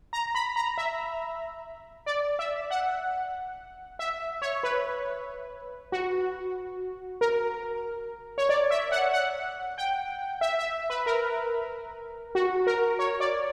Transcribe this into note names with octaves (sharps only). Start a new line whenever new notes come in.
A#5
B5
A#5
E5
D5
E5
F#5
E5
C#5
B4
F#4
A#4
C#5
D5
E5
F#5
F#5
G5
E5
E5
B4
A#4
F#4
A#4
C#5
D5